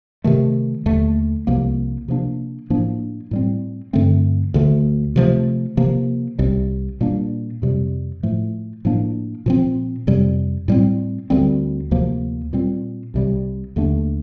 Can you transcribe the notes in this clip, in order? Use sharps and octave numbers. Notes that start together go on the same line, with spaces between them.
C3 D#3 A3
D#2 D3 A3
C2 C3 F3 A#3
C3 F3 A#3 D4
A2 F3 A#3 D4
A2 G3 C4
G2 D3 A3 C4
D2 D3 A3
C3 F3 A3
C3 F3 A#3
C2 C3 G3
A#2 G3 A#3 D4
F2 C3 G3
A2 F3 A3
A2 F3 A#3 D4
A#2 F3 C4
F2 C3 G3
A2 G3 C4
D2 D3 G3 C4
D2 C3 F3 A#3
A#2 G3 C4
C2 C3 G3
D#2 D3 A3 D4